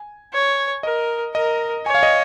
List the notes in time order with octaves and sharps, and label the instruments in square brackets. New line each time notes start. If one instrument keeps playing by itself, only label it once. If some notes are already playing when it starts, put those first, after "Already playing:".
Already playing: [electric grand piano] G#5
[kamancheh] C#5
[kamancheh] A#4 [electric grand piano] D#5
[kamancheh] A#4 [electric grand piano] D#5
[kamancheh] C#5 [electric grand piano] G#5
[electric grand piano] F5
D#5